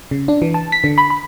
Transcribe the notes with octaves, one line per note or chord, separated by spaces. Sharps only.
C#3
D4
E3
A5
B6
D3
B5
B5